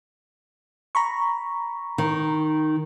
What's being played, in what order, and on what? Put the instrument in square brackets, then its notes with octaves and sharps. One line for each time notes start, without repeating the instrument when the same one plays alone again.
[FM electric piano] A#5 B5 C#6
[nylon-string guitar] D#3